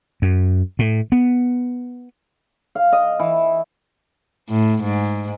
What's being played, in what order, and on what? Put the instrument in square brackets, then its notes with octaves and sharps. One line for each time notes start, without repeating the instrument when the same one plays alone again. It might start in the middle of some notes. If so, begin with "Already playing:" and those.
[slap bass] F#2
A2
B3
[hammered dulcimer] F5
D#5
E3
[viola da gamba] A2
G#2